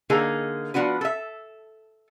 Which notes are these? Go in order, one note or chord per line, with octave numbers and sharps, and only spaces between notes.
D3 A#3 D#4 G#4 A4
F3 B3 D4 F#4 B4
A4 E5